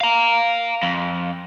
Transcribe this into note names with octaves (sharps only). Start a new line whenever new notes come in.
F5 A#5
F2